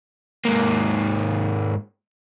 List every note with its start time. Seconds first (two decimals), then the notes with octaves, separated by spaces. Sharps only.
0.45 G#2 A#3